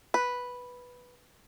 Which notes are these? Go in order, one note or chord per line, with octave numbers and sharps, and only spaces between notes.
B4